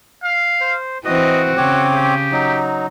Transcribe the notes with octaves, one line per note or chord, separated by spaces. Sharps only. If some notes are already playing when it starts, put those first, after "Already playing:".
F5
C5
E3 C4 F#4 D#5 D#6
C#3 C4 C#5 D6
G4
F#3 D#4